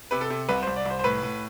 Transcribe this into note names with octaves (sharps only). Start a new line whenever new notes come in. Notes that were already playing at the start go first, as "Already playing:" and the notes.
C3 B4
A4
C3
C2 B4
C2 C5
D5
C2 C5
C5
A2 B4
A2